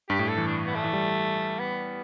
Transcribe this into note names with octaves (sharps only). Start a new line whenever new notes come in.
G2 G4
A2
A4
E3
D4
B3
A3
E3
G3
B3